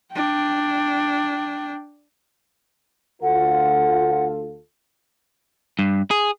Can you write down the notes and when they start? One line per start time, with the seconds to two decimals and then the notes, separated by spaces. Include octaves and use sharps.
0.13 D4 G5
3.22 D2 F4 A4 F#5
5.79 G2
6.11 G#4